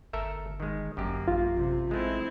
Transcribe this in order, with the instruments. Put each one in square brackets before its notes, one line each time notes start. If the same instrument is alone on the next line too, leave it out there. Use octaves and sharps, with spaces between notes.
[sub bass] G1 [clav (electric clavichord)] A4 A#4 E5
[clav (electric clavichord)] D#3 G#3
[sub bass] G1 [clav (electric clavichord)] F#2 G4 [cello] A#3
[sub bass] A1 [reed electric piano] F4
[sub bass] A1 [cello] C3
[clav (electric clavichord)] G#3 A3 [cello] C4 E4